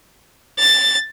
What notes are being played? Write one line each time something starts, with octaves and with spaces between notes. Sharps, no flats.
A6